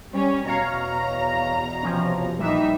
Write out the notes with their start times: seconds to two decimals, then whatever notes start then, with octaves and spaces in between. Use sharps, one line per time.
0.11 G3 C#4
0.47 E2 B2 C#5 F5 A#5
1.83 C3 F3 C#4
2.39 A#1 E3 G3 D#4 E5